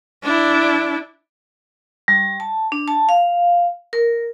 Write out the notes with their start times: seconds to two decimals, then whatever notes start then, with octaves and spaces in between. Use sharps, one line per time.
0.24 D4 E4
2.08 G3
2.40 A5
2.72 D4
2.88 A5
3.09 F5
3.93 A#4